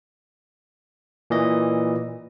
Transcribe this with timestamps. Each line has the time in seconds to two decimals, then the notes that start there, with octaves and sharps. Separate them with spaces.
1.30 A#2 E3 D#5